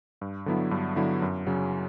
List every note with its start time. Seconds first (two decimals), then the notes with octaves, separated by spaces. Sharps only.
0.21 G2
0.46 D3 F#3 B3 E4
0.71 G2
0.96 D3 F#3 B3 E4
1.22 F#2
1.47 C#3 F#3 C#4